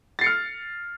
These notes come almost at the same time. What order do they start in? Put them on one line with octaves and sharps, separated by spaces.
A6 C7 C#7 F6